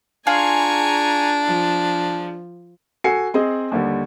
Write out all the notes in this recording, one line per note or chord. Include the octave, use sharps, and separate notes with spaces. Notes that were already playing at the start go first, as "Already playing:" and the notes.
D4 F4 G#4 F5 G#5 A#5 C#6
F3
F#4 A4 G#5 C7 C#7
C4 G#4 D#5
D#2 D3 G3